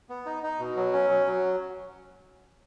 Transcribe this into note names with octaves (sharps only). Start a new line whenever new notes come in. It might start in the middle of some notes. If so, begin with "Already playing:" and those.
B3
D#4
D#4
B2
F#3
C#4
F#3
F#3